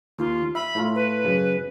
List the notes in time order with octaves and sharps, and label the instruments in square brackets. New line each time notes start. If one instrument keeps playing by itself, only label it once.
[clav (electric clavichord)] D#2 [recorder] F4
[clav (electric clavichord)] E5 [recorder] B5
[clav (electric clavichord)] A2 A3 F4
[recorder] B4
[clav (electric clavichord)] F#2 C#3